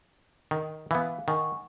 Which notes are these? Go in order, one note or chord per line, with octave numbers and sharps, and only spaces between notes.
D#3
E3 B3 F5
D#3 F#5 G#5 C#6